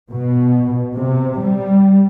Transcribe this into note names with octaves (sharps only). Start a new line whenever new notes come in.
B2
C3
G3